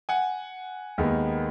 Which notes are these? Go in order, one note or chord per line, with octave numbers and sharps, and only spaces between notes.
F#5 G#5
D#2 D#3 G#3 B3